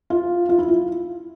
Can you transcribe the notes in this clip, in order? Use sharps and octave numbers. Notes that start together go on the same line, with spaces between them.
F4
F4
E4
F4